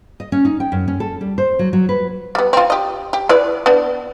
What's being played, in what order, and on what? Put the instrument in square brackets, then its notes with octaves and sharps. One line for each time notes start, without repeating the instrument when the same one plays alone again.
[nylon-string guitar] D#5
C#4
D#4
G5
F#2
C#4
A4
G3
C5
F#3
F#3
B4
[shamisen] G3 B3
C4 F4
G4 D#5
G4
E4 B4 D5
B3 D4